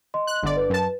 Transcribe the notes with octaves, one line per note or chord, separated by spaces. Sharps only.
D#5 C6
F#6
G1 D3 D5
B4
F#2 A5